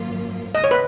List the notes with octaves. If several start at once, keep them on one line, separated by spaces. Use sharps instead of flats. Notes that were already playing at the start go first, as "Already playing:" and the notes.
Already playing: G#1 F#2 F3 A#3 F4
D#2 C#3 G#3 D#5
C#5
B4